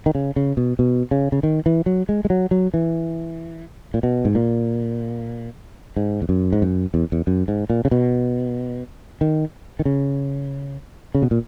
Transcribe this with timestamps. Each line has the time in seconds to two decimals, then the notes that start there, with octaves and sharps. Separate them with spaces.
0.06 D#3
0.15 C#3
0.36 C#3
0.57 B2
0.79 B2
1.11 C#3
1.32 C#3
1.43 D#3
1.66 E3
1.86 F#3
2.09 G#3
2.25 G#3
2.30 F#3
2.51 F#3
2.74 E3
3.94 A#2
4.03 B2
4.25 G#2
4.35 A#2
5.97 G#2
6.22 E2
6.29 F#2
6.53 G#2
6.62 F#2
6.94 E2
7.12 E2
7.27 F#2
7.48 G#2
7.70 A#2
7.85 C#3
7.91 B2
9.21 D#3
9.79 D#3
9.85 C#3
11.15 C#3
11.22 B2
11.31 A#2